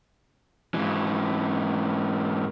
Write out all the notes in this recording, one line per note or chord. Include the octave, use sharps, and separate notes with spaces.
G#2 E3